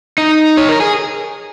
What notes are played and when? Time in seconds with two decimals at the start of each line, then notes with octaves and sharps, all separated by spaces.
0.18 D#4
0.57 C#5
0.69 A#4
0.80 G#4